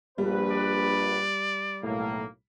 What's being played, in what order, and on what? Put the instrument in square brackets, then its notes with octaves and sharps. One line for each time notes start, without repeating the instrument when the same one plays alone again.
[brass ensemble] A#1 B4 [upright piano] G3
[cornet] D5
[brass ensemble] B1 A2 A#3